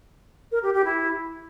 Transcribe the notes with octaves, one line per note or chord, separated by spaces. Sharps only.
A#4
G4
G4
E4